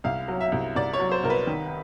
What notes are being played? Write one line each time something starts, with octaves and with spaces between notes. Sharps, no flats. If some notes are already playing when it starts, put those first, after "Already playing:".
C2 F5
F#3
E5
C2
C2 D5
C#5
F#3
C5
C2 A#4
B4
D#3